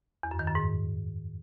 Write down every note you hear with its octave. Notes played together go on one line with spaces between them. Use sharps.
E2
F#2
D#3
F#2
G#2